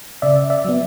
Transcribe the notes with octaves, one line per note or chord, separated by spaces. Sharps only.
C#3 D5 E5
D5 E5
F#3 B3